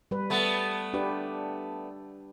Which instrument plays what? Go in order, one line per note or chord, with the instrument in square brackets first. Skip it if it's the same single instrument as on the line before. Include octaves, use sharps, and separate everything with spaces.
[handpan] G3 B4
[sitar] A3 B3
[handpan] D4 G4 B4